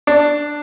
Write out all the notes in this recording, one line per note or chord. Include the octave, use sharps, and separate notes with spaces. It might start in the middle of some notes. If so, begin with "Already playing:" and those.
D4